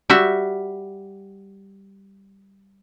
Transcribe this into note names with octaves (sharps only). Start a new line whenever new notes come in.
G3 F#4 E5